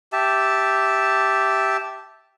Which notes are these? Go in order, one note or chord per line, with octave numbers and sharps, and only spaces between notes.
G4 E5 A5